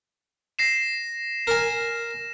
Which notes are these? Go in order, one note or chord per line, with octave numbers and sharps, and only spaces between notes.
A#6 C7 E7
A#4 G#5 A#6 E7